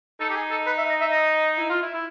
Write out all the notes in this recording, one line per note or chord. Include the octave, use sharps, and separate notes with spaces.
D#4 A4
G4
G#4
A4
B4
E5
D#5
E5
D#5
E4
F4
E4
E4